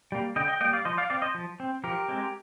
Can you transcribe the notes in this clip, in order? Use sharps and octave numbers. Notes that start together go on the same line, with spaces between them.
G3 A#3
D3 D#5 G5
D#5 G5
G3 A#3 D#5 G5
D5 F5
F3 C5 D#5
D5 F5
C4 D5 F5
C5 D#5
F3
C4
F3 G4 A#4
G#3 C4